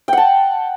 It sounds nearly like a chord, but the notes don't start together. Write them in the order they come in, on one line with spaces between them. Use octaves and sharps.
G5 F#5 A5